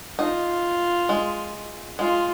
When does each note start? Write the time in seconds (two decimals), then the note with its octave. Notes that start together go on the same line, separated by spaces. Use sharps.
0.19 D#4 F4
1.09 G#3
1.99 G#3 F4